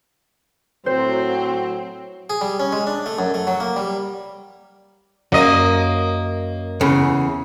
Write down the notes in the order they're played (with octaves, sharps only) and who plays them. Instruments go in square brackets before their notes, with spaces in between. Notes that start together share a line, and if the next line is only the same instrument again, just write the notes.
[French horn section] A2 F#3 [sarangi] C4 [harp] C5
[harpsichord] G#4
G3
C#4
G#3
D4
A3
F#2
A3
F#3
A#3
G3
[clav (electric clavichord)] F#2 F#3 [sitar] A#3 D#5
[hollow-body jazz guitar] E2 C#3